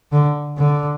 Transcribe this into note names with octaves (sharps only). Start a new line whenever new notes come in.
D3
D3